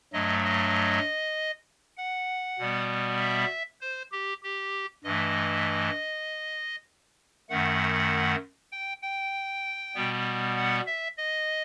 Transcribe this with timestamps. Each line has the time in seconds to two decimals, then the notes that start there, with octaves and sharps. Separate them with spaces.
0.13 G2 F#3 A3 D#5
0.44 D#5
1.97 F#5
2.59 B2 G3 B3
3.20 E5
3.81 C5
4.12 G4
4.43 G4
5.04 G2 E3 A3 D#5
7.49 F#2 D#3 A3 F#5
8.72 G5
9.02 G5
9.95 B2 G3 B3
10.56 F#5
10.87 E5
11.17 D#5